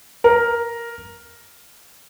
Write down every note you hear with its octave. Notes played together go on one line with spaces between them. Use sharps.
A#4